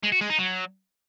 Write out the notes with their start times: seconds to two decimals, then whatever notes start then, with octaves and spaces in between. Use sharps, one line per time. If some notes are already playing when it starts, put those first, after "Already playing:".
0.03 G#3
0.12 F#4
0.21 G#3
0.30 D#4
0.39 F#3